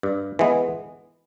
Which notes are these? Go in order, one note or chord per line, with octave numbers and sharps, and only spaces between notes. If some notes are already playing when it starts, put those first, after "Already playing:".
G2
E3 G#3 B3